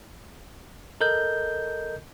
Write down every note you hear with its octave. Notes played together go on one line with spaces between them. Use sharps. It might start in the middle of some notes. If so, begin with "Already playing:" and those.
A4 A#4 D#5 G6